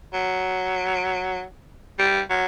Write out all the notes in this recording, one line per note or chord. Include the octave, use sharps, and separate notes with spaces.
F#3
G3
F#3